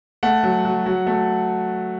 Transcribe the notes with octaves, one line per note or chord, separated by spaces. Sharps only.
A3 F#5
F#3
F#3
F#3
A3